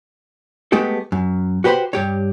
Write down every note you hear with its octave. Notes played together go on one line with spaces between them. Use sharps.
G#3 A3 B3 G4 A4
F#2
F#4 G4 B4 C5 B5 C6
G2 G4 C#5